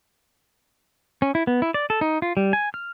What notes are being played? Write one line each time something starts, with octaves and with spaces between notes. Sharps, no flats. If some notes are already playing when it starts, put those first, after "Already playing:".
C#4
E4
B3
E4
D5
A4
D#4
F4
G3
G#5
F6